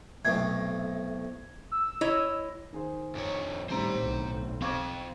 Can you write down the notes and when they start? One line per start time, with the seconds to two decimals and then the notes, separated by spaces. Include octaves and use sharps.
0.25 B1 A2 C3 G#6
1.72 E6
2.01 E4 C#5 D#5
2.73 D#3 G#4 C5
3.15 F2 C#5
3.69 A2 D#3 G3 C4 C5 A#5
4.03 B1
4.62 C4 F5 C#6 D6 G#6